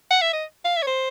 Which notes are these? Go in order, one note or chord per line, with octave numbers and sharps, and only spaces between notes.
F#5
E5
D#5
F5
E5
C#5
C5